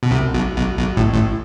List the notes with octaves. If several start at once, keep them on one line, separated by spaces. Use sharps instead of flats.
B2
C2 C3
B1 B2
B1 B2
B1 B2
A1 A2
A1 A2